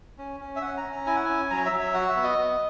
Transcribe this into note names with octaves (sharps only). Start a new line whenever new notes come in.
C#4
C#4
E5
C#4 F#5
A#5
C#4
A#5
E4 G#5
F#5
C#4 G#5
F#3 A#5
E5
F#3
E5
F#4 F#5
E5
B3
D#5
B3